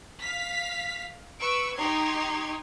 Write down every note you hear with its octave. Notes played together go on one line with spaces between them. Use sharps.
F5 B6
B4 C#6 E6 D7
D#4 G4 C6 C#6 G#6